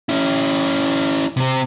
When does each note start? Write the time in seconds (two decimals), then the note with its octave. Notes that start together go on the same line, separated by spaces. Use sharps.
0.09 C#4 E4
1.37 C3 C4